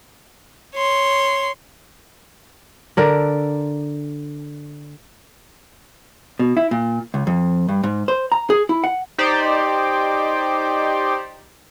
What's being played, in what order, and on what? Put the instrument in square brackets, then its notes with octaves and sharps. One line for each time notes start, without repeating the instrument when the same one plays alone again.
[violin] C#5 C6
[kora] D3 A#4 D5
[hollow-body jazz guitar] B2
E4
A#2
C#2
F2
G2
G#2
C5
A#5
G#4
E4
F#5
[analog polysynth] D#4 G4 C5 D5